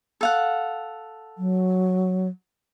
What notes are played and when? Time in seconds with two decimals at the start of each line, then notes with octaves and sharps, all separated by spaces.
0.21 A4 F5 F#5
1.38 F#3